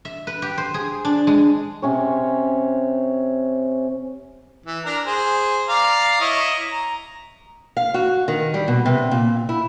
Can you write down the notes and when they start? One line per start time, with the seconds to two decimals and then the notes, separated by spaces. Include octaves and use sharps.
0.05 E5
0.27 B4
0.42 G4
0.58 C5
0.74 G#4
1.05 D4
1.27 G#3
1.82 C3 C#4 C#5
4.66 E3
4.85 D4 A#4 A#5
5.06 G#4 C5
5.69 D5 F5 A#5
6.21 E4 C#5 D#5
6.72 A#5
7.77 F5
7.94 F#4
8.28 D#3
8.54 G3
8.68 B2
8.85 C3
9.11 A#2
9.49 E4